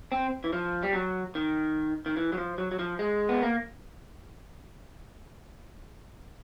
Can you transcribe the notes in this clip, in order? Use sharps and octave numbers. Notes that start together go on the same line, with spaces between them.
C4
E3
F3
G3
F#3
D#3
D#3
E3
F#3
F3
F#3
F#3
F3
G#3
B3
A#3